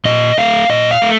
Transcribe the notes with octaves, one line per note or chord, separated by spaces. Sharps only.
A#2 D#5
A3 F5
A#2 D#5
F5
A3